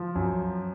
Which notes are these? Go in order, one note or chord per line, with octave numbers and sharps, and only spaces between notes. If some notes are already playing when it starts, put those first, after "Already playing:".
Already playing: F3
F#2